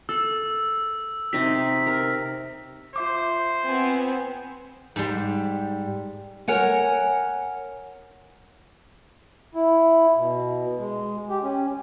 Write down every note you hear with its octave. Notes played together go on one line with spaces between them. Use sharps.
A4 E6
C3 D#4 G4 B6
A#4
F4 C5 E5 D6
B3 C4 G#5
G#2 G3
A#4 C#5 F#5 G#5
E4
B2
G#3
G4
C#4